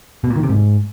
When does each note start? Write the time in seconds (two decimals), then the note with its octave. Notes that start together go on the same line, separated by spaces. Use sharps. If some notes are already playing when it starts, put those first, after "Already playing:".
0.24 B2
0.30 A#2
0.37 D#3
0.43 C3
0.50 G#2